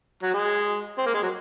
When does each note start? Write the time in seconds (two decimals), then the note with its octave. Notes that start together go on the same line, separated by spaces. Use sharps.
0.23 F#3
0.34 G#3
0.98 C4
1.06 A#3
1.14 G#3
1.22 F#3